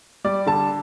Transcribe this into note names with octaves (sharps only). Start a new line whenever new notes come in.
G3 D5
D3 A5